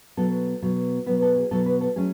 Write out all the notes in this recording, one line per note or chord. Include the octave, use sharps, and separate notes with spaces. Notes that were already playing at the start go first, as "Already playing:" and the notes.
B2 F#3 B3 A4
B2 F#3 B3
B2 F#3 B3 B4
A4
G#4
B2 F#3 B3 A4
B4
A4
F#3 A3 C#4 G#4